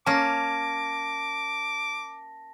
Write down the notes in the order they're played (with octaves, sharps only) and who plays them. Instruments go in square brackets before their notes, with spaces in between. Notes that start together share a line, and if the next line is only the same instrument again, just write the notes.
[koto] A#3 C#4 [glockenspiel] A5 A#6 [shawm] D6